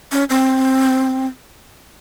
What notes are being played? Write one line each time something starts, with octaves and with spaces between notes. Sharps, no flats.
C#4
C4